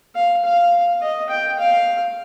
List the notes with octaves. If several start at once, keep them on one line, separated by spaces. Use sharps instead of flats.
F5
F5
D#5
G5
F5